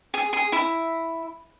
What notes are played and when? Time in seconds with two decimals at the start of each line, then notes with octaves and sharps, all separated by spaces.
0.14 G#4
0.33 G#4
0.52 E4